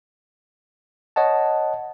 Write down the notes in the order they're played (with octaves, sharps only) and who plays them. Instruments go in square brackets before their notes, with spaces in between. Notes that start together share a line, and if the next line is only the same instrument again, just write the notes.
[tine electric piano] C#5 D#5 F#5 A5